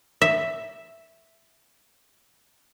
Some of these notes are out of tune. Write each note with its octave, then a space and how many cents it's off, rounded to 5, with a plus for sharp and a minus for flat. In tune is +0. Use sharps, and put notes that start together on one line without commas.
E5 +0